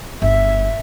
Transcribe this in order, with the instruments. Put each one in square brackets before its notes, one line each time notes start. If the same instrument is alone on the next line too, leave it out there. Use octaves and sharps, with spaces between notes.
[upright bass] G1 [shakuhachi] E5